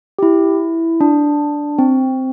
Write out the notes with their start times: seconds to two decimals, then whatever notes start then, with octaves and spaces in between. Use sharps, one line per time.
0.19 G4
0.23 E4
1.01 D4
1.79 C4